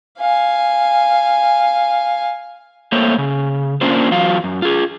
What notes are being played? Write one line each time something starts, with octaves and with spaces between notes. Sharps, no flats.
F5 G#5
A3 A#3 C5 C#5
C#3
A#3 C#4 D4 F4 C5
E2 F#3 F4 F5
F#2
F4 G#4